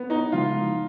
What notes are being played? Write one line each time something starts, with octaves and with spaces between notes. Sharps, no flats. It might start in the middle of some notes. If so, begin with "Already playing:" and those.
Already playing: B3
D#4
C#3 F3 G#3 D#4 F4